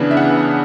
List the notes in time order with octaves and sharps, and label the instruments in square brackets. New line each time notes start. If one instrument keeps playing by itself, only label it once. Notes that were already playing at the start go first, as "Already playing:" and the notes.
Already playing: [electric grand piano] C#3 E3 B3 D4
E5
F#5